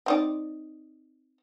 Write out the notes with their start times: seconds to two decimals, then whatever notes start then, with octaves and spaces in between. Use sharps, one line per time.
0.06 C4 D#4 D5